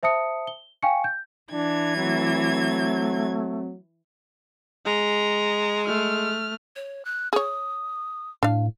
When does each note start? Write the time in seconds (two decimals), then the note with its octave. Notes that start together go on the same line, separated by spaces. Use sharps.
0.03 C5 E5 A5 D#6 C#7
0.47 G7
0.82 F5 G5 G#5 C#6 C#7
1.04 G6
1.52 E3 D4 G#6
1.97 F#3 A3 C4
4.86 G#3 A#5
5.86 A3 F6
6.76 C#5
7.05 F#6
7.33 G#4 C#5 D#6
8.43 A2 D4 F5